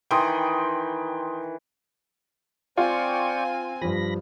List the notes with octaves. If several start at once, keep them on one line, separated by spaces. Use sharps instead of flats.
D#3 E3 G5 B5 C6 D#6
C4 F4 D5 G5 G#5 C#6
G2 F3 B5 A#6